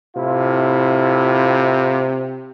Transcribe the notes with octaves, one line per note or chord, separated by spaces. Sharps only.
A2 C3 E4 F4